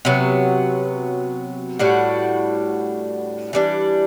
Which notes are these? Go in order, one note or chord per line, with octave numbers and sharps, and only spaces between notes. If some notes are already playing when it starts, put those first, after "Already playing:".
C3 F#3 B3
A2 G3 D4 F#4
E3 G3 D4